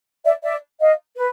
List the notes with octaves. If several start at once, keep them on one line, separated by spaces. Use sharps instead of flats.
D5 E5
D5 E5
D#5 F5
B4